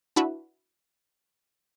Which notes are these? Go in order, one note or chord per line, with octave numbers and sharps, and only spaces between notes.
D4 E4 F#4 B4 E5